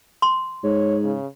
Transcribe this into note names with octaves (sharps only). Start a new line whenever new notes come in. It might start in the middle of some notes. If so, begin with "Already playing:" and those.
C6
G#2 C#5
C#3